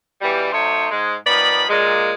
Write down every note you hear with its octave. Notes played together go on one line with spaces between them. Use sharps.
B2 E3 G3
F#3 A3 D#4 C5 C#5
G#2 G#3
D#3 F3 B3 D5 B5
A#2 G#3